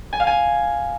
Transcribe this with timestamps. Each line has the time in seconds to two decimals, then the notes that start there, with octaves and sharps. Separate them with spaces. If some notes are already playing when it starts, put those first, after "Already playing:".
0.13 G#5
0.20 F5
0.27 G#5